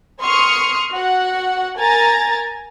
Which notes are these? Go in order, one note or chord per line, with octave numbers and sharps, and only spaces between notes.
C6 C#6 D#6 F6 C7 C#7
F#4 F#5
A#4 G#5 A#5 A6